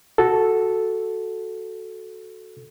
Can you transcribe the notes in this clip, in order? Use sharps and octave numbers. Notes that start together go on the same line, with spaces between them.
F#4 A4